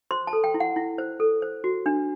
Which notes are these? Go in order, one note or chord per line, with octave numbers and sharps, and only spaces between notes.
C5 C6
A5
A4
G5
E4
F#5
E4
C5
A4
C5
F#4
D4